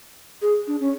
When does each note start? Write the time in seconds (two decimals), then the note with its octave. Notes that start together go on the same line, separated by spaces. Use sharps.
0.42 G#4
0.67 D4
0.80 C#4